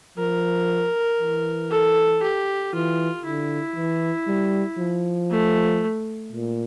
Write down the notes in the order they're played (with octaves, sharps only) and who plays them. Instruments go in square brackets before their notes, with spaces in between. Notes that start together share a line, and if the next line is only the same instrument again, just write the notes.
[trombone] F3 [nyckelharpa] A#4
[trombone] E3
[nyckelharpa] A4
G4
[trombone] E3 [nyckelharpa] F4
[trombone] D3 [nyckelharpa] E4
[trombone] E3
G3
F3
[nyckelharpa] A3
[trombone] A#2